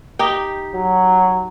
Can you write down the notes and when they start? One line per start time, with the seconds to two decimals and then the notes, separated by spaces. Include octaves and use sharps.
0.19 D#4 G4 G5
0.75 F#3